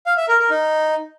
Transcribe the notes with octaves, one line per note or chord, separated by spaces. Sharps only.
F5
E5
A#4
A#4
D#4